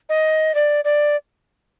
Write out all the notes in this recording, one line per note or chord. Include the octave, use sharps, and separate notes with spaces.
D#5
D5
D5